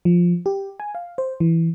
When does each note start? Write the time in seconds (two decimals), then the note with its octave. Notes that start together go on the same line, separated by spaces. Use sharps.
0.05 F3
0.46 G4
0.80 G#5
0.95 F5
1.18 C5
1.40 E3